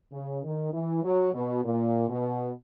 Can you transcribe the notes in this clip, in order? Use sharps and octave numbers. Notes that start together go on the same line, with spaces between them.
C#3
D#3
E3
F#3
B2
A#2
B2